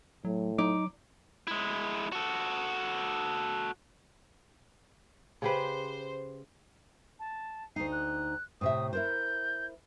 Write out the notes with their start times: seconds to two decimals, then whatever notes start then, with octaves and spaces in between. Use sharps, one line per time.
0.25 A2 F#3
0.59 F#3 D#4 D6
1.47 G#3 E4
2.12 F#4 A4
5.42 C#3 G4 B4 C5
7.20 A5
7.76 D2 D#4 C7
7.92 F#6
8.61 A2 C3 E5 D#6
8.93 E4 A#4 C5 G6